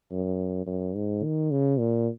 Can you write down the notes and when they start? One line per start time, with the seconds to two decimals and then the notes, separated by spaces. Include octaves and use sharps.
0.11 F#2
0.66 F#2
0.95 G#2
1.24 D#3
1.51 C#3
1.79 A#2